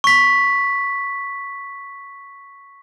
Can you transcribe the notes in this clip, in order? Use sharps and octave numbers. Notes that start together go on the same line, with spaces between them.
C#6 B6